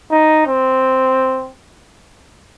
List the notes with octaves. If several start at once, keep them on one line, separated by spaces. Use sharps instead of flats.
D#4
C4